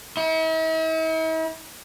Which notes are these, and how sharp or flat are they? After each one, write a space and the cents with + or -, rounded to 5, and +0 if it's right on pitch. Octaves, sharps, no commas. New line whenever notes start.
E4 -45